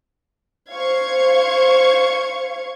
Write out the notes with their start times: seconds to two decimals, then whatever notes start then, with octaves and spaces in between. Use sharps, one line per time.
0.70 C5 F5 C#6 G#6